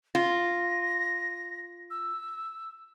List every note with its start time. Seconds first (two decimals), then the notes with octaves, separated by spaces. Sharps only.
0.15 F4 A#6
1.90 E6